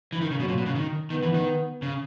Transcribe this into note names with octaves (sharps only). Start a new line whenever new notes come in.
E3
D#3
C#3
B2 F#3
A#2
B2
C#3
D#3
D#3 B3
E3
D#3
C#3